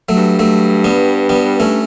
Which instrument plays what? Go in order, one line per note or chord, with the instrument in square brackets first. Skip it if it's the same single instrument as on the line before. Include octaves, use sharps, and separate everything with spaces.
[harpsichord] F#3 A3
[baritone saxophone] G2
[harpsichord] F#3 A3
G3 B3
G3 B3
A3 C#4